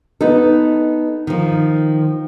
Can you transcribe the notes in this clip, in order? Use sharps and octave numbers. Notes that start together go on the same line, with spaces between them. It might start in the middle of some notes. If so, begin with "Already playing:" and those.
B3 D#4 A4
D#3 F3